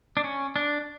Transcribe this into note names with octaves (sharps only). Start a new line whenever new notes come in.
D4
C#4
D4